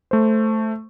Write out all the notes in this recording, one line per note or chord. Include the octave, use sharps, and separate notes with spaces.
A3 C5